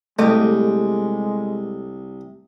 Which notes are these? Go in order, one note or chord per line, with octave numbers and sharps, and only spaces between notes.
C2 G#3 A3 G4 A4 D#5